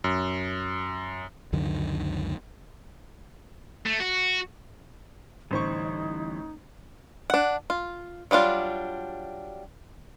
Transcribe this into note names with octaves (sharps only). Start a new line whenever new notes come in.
F#2
C#2 F#2 D3 D#3
A3
F#4
A1 D3 E3 G3 D#4 C5 C#6
D4 F#5
F4
F#3 G3 D4 F4